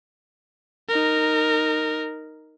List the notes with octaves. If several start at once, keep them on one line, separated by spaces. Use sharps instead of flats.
D#4 A#4